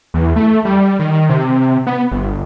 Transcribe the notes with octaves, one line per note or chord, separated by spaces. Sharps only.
E2
A3
G3
D#3
C3
B3
G1